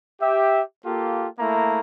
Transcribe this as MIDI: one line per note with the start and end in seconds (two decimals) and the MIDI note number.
0.21 0.61 67
0.21 0.61 76
0.85 1.27 58
0.85 1.27 65
0.85 1.27 67
0.85 1.27 69
1.38 1.80 57
1.38 1.80 58
1.38 1.80 64
1.38 1.80 82